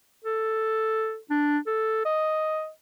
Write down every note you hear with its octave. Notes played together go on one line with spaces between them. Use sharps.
A4
D4
A4
D#5